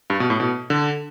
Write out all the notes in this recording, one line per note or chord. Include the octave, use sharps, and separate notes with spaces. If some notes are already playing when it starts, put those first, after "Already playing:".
G2
B2
A2
B2
D3